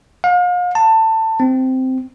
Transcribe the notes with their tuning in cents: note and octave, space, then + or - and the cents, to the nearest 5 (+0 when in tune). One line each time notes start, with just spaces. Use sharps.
F5 +40
A5 +20
C4 -10